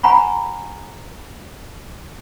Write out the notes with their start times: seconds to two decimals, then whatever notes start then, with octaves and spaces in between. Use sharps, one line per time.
0.03 F#5 G#5 A#5 B5 C#6